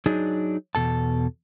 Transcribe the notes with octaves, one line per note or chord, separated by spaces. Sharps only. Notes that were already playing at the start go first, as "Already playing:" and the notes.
F#3 D4 D#4 G#4
E2 B2 A4 A5